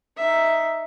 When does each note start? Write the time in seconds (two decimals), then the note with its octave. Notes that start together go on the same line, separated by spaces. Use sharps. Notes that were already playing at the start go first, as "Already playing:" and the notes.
0.17 D#4 E5